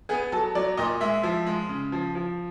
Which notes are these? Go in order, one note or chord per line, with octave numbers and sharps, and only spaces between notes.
B3 G#4
F#3 A4
F#3 D5
A#2 D#5
G#3 E5
F3
G#3
C#3
F3
F3